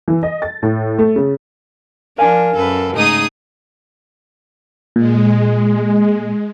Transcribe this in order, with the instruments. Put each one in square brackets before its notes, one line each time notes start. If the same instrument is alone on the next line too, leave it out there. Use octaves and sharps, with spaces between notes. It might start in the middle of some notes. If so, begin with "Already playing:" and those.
[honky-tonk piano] E3
D#5
A6
A2
A3
C#3
[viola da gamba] F3 D4 [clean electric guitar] A#4 F5 G#5
[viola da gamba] F#2 A4 B4
[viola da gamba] G#2 C#3 A3 [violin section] D#4 G#4 D#6
[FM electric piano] A#2 [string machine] G#3